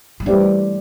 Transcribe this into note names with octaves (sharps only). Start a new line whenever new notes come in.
F#3
E3 G3 A3 D4 G4 C5